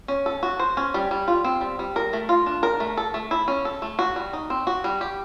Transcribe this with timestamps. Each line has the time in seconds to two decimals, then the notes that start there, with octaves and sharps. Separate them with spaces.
0.08 C#4
0.26 A4
0.43 F#4
0.60 C5
0.77 C#4
0.94 G3
1.11 G3
1.28 F4
1.44 C4
1.61 G3
1.79 G3
1.96 A#4
2.13 A3
2.29 F4
2.46 D4
2.63 A#4
2.80 A3
2.97 A4
3.14 A3
3.31 E4
3.48 C#4
3.65 A4
3.82 A3
3.99 F#4
4.16 G3
4.33 D#4
4.50 C4
4.67 F#4
4.84 G3
5.01 G4